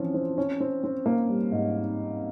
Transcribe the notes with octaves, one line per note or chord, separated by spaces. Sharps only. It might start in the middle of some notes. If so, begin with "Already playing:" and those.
Already playing: E3 F3 C4 C#4
C4
C#4
C4
C4
A#3
G3
G#2